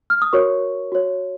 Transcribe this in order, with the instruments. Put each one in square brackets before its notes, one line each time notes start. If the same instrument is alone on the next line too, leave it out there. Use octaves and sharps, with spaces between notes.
[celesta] F6
D#6
F#4 A#4 C#5 C#6
F#4 C#5